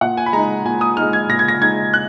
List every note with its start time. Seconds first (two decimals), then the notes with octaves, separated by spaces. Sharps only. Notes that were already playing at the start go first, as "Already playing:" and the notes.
0.01 A#2 F#5
0.17 G#5
0.26 B5
0.33 G#3 D#4 A#5
0.65 A#2 G#5
0.81 D#6
0.97 G#3 D#4 F6
1.13 G#6
1.29 A#2 A#6
1.39 G#6
1.48 A#6
1.61 G#3 D#4 G#6
1.94 F#6